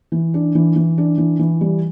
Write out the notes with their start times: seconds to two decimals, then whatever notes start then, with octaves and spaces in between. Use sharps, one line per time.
0.12 E3
0.34 D4
0.55 E3
0.76 E3
0.98 D4
1.18 E3
1.39 E3
1.61 G3